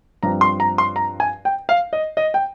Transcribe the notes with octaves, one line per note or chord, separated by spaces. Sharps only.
G2 F3 C4 A#5
C6
A#5
C6
A#5
G#5
G5
F5
D#5
D#5
G5